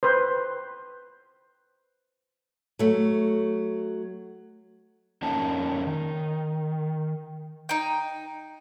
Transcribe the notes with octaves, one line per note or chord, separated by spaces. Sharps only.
B4 C5
F#3 A3
F2 A#3 C#4 D#4 A5
D#3
D#4 G5